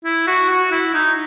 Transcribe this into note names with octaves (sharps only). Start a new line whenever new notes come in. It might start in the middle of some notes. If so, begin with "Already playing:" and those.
E4
F#4
F#4
E4
D#4